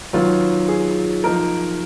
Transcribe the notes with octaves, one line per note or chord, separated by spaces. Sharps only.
D#3 F#3 B3 F4
G#4
F3 A#3 D#4 A#4